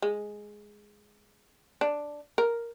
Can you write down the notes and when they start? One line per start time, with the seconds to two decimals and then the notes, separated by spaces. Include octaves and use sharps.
0.02 G#3
1.81 D4
2.38 A#4